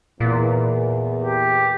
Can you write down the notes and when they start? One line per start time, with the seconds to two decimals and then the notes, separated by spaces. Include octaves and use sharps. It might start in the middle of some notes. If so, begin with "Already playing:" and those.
0.20 E2 A#2
1.23 G4